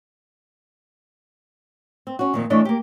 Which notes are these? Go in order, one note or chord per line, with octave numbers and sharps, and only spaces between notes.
C4
C#4 F#4
F2 A#2 D#3
E3 A3 D4 C#5 D#5
A#3 G4